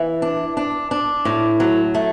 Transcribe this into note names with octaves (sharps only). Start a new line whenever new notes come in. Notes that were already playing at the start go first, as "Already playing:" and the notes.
Already playing: E3
D4
D4
D4
A2
F#3
A3